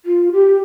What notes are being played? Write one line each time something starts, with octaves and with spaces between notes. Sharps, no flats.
F4
G4